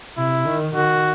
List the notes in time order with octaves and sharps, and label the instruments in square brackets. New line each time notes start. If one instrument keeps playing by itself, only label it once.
[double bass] C3 [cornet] E4
[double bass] D#3
[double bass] D#3 [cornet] F#4